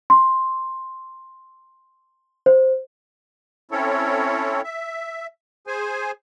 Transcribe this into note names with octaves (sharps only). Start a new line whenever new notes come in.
C6
C5
C4 C#4 E4 A4 C#5
E5
G#4 C5 G#5